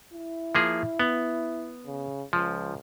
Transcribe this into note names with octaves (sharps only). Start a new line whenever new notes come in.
E4
F3 A#3 G#4
B3
C#3
C#2 F3